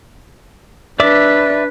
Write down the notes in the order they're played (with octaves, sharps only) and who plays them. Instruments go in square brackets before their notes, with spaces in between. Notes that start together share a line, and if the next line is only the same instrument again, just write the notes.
[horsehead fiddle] D4 B4 [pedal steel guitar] D5 E5 D6